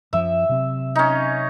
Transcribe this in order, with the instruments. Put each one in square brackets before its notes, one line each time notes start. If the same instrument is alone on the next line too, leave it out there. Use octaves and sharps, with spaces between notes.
[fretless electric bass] F#2 F3 [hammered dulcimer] E5
[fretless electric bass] C3 F#3 C4
[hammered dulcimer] C#4 D#4